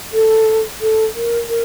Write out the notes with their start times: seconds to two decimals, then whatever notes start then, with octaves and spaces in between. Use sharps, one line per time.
0.13 A4
0.81 A4
1.15 A#4
1.49 A#4